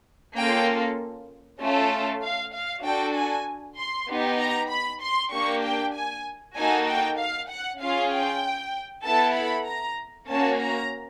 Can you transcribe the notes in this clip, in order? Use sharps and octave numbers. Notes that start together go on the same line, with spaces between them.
A#3 C#4 F4 A4 G5
A3 C#4 F4 A4
F5
F5
D4 F#4 A4 G5
G#5
C6
B3 D#4 G4
A#5
B5
C6
A#3 D4 G4 C#6
G5
G#5
A#3 D#4 F#4 A4 G#5
G5
F5
F#5
C#4 F4 G#4 F5
G5
B3 E4 A4 A5
B5
A#5
A#3 C#4 F#4 A5
A#5